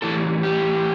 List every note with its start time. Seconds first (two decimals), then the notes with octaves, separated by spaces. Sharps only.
0.02 A2 E3 G3 A4
0.43 G4